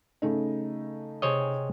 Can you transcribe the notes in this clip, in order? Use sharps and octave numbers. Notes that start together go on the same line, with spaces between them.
C#3 A3 D#4
C3 G#4 C5 C#5 D#5